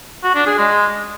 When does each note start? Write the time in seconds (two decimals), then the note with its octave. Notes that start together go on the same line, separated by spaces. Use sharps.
0.24 F#4
0.35 D4
0.47 G#4
0.58 G#3